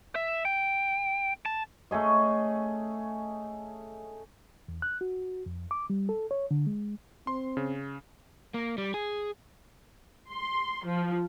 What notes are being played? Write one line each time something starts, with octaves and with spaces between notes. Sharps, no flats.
E5
G5
A5
A3 C#4 G#4 D#5
E2
F#6
F#4
F2
D6
G3
A4
C#5
D3
G#3
C4 C6
C#3
A#3
G3
G#4
C6
F3